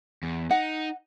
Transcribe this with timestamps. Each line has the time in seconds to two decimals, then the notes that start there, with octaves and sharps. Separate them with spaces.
0.23 E2
0.51 D#4 F#5